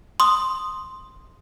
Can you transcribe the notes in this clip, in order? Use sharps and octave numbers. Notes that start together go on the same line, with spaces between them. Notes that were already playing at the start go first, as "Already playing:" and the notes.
C6 D#6